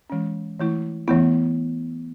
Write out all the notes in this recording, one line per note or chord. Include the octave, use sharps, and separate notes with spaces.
E3 G#3 C#4
E3 A3 E4
E3 A3 B3 E4